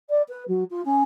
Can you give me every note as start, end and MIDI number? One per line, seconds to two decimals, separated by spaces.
0.09 0.22 74
0.28 0.43 71
0.48 0.63 54
0.70 0.81 65
0.85 1.03 61